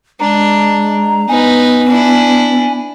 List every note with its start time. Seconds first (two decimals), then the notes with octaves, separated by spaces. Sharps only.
0.20 G#3 D4 A#5
1.29 B3 D#4 B4 G#5
1.88 D4 E4